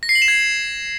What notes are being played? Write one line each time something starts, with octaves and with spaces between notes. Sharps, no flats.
A#6
C7
F#7
E7
G#6